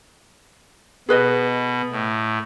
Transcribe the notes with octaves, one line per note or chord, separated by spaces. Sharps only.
B2 G#4 B4 D#5
A2